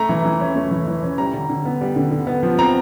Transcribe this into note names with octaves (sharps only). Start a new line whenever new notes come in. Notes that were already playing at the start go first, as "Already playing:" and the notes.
Already playing: A3 A#5
E3
E3
C#4
A3
E3
E3
C#4
G3 A#5
D3
D3
B3
G3
D3
D3
B3
F3
C4 A#5